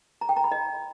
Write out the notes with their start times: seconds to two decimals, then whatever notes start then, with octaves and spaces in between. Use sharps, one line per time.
0.21 A#5
0.29 G5
0.36 A#5
0.44 B5
0.52 D#5